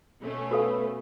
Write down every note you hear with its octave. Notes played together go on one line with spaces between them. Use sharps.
B2 A3 C#4
F#4 A4 B4 F5